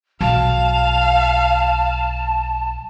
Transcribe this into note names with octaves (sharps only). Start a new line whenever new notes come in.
B1 F5 A5